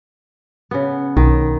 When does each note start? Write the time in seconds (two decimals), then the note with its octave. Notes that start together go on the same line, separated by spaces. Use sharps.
0.71 C#3 B3
1.17 B1 D#3